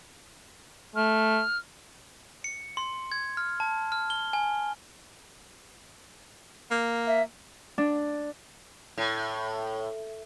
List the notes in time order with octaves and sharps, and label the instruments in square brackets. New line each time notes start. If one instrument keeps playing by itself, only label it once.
[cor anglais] A3 [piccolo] F6
[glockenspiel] C#7
C6
G#6
F6
A5
F6
G7
G#5
[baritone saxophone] A#3
[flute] E5
[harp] D4
[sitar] A2